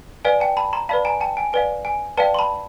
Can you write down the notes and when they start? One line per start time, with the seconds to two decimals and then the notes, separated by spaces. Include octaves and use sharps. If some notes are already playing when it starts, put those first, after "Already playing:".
0.25 B4 D5 F5 G#5
0.40 G5 A5
0.57 A5 B5
0.73 A#5 C6
0.89 B4 D5 F5 A5 B5
1.05 G#5 A#5
1.21 G5 A5
1.37 G#5
1.53 B4 D5 F5 G#5
1.85 G#5
2.17 B4 D5 F5 G5 A5
2.34 C6
2.39 A5 B5